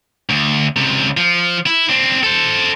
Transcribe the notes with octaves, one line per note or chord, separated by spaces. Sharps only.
D2
C#2 C3
F3
E4
C4 D4
A4 C5